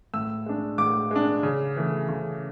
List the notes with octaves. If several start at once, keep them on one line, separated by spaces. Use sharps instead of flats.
A2 E6
G#3 D4
A2 D6
G#3 D4
C#3
E3 A3
C#3